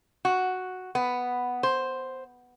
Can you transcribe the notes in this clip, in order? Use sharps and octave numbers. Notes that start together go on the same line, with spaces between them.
F#4
B3
C5